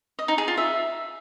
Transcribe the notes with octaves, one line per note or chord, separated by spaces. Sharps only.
D#5
D#4
G#4
F4
E5